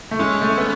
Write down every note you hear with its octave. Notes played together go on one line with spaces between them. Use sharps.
A3
G#3 C#4
A3
B3